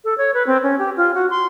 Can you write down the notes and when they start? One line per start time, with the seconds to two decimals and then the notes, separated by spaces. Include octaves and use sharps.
0.04 A4
0.18 C#5
0.34 B4
0.47 C4
0.63 C#4
0.79 G4
0.97 F4
1.14 F#4
1.30 C6